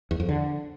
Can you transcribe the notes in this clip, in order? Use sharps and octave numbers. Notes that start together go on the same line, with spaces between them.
E2
F2
D3